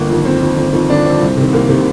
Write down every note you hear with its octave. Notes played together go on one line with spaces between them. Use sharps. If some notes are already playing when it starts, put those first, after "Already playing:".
Already playing: G1 A#3
F2 D#3
G1 C4
F2 D#3
G1
F2 D#3
G1 D4
F2 D#3 C4
C2
C3 D#3
C2 A#3
C3 D#3